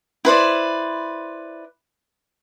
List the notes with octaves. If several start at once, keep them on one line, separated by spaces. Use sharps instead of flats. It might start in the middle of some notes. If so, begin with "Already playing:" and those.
E4 B4 C5 D5